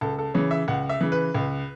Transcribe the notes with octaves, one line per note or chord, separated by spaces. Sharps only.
C#2 A4
A4
C#3 E3 C#5
E5
C#2 F#5
E5
C#3 E3
B4
C#2